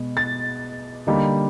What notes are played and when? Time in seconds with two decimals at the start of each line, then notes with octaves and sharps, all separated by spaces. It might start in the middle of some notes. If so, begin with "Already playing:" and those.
Already playing: B2 G#3 B3
0.17 A6
1.07 D3 G3 A#3 D#4